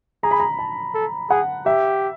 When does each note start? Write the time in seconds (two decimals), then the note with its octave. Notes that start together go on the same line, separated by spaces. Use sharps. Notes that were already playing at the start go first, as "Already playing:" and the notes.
0.23 G#4 A#5
0.31 B5
0.40 A#5
0.59 A5
0.95 A4
1.30 G#4 F#5
1.66 G4 E5